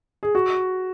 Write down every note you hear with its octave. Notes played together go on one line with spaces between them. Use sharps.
G#4
F#4